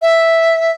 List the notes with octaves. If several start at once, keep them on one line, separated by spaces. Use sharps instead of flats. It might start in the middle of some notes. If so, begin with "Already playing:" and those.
E5